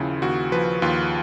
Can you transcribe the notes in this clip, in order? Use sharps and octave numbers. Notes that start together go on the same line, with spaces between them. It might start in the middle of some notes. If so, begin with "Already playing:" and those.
Already playing: D#2 C#3 F3 E4 F4
D#2 F#4
F3 B4
D#2 F4